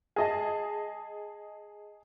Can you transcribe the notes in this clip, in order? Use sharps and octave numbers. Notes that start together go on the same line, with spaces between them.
G#4 D#5 A5